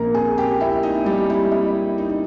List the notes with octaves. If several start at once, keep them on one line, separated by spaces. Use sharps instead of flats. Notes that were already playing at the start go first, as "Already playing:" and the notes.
Already playing: A#1 A#2 A#3 A#4 A#5
G#4 G#5
G4 G5
E4 E5
D#4 D#5
G3 G4
E4
E4
D#4
D#4